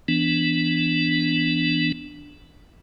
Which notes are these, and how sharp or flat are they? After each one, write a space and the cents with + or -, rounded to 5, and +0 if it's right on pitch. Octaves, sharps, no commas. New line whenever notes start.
E3 +0 B3 +0 D4 +0